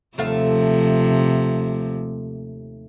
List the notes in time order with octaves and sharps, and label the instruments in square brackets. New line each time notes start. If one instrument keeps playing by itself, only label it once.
[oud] D#2 A3 F5 [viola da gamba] C3 F3